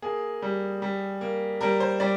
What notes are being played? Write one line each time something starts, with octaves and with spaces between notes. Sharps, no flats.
A#3 G#4
G3
G3
A#3
G3 A#4
C5
G3 D5